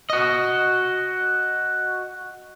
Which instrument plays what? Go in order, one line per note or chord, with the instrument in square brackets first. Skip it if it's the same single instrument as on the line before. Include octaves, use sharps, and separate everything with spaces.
[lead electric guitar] F#4 D#5